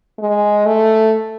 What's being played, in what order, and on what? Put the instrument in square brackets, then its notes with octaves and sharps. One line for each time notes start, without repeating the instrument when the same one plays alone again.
[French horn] G#3
A3